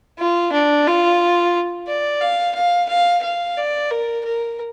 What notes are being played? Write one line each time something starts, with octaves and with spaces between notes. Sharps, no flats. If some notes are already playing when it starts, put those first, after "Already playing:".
F4
D4
F4
D5
F5
F5
F5
F5
D5
A#4
A#4